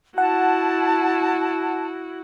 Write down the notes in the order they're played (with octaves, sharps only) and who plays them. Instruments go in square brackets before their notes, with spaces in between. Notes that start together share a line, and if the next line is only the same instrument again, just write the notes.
[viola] E4 F#4 [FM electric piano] F#5 [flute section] A5